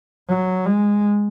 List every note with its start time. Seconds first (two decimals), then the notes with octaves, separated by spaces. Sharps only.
0.29 F#3
0.66 G#3